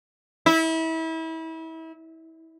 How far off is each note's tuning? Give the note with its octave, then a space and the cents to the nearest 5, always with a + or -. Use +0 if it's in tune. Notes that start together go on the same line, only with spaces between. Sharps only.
E4 -30